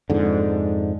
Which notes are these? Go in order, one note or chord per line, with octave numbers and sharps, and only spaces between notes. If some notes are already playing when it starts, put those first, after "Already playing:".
F2 G#2 D3